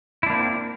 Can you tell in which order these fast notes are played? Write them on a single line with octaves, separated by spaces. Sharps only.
E4 D4 A#3 C4